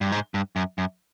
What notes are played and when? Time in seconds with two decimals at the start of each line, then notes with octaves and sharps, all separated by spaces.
0.01 G2
0.12 G#2
0.34 G2
0.56 F#2
0.78 F#2